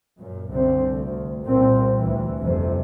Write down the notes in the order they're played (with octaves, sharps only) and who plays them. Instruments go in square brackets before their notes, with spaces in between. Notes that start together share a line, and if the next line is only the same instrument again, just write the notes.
[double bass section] F#2 A#2
C2 D3 C4
D2
C2 A#2 C4
D2 E3
G1 F2 C3